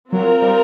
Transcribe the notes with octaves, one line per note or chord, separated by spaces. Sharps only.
F#3 C4 F4 A#4
G3